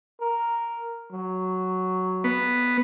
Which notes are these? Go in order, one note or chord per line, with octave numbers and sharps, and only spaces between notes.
A#4
F#3
B3